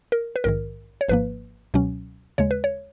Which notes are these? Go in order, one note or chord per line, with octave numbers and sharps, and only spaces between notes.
A#4
B4
A#1 G#2 D#3 A#4
C#5
G#1 G#2 F3 A#3 B4
C#2 B2 F#3 C#4
D#2 C#3 G#3 C#5
B4
C#5